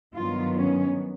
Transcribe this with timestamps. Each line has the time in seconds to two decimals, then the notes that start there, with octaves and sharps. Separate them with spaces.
0.14 G2 D#3 F#3 B3 F4
0.55 C#4